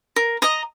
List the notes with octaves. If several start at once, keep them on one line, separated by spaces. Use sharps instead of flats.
A#4
D#5 A#5 D#6